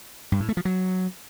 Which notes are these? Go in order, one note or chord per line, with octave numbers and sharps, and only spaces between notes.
G2
A2
A3
F3
F#3